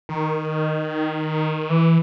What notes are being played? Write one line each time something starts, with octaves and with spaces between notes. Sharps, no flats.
D#3
E3